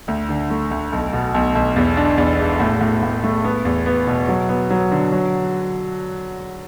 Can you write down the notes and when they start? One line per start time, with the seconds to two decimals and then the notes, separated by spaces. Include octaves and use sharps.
0.08 D2
0.29 D3
0.50 A3
0.71 D2
0.92 B1
1.13 B2
1.34 B1
1.55 B1
1.76 E2
1.97 D4
2.18 E2
2.39 E1
2.60 A2
2.81 A2
3.03 A2
3.24 A3
3.44 B3
3.65 E2
3.86 B3
4.07 B2
4.28 F#3
4.49 B3
4.70 F#3
4.91 D3
5.12 F#3